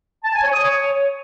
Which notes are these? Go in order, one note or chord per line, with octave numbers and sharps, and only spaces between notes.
A5
G#5
C#5
D#6
C#5